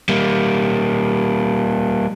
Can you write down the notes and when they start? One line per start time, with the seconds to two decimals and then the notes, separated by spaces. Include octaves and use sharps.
0.09 G3 A#3